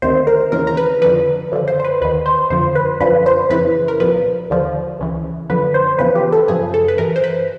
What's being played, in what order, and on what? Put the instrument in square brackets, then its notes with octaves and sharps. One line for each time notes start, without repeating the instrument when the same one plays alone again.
[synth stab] D2 C3 D#3 C5
A#4
D#2 C#3 E3 A#4
A#4
B4
F2 D3 F3 B4
F#2 D3 F3
C5
C5
B4
D#2 D#3 B4
C5
F2 D3 F3 C5
B4
F#2 D3 F3 B4
C5
F2 C#3 E3 B4
A#4
C2 A#2 F3 B4
D#2 D3 F3
C#2 C#3 E3
F#2 D3 F3 B4
C5
E2 C#3 F3 B4
G4
A4
F#2 C#3 F3 G#4
A4
B4
G2 E3 A#4
C5
B4